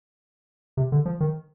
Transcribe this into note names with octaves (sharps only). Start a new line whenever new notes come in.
C3
D3
F3
D#3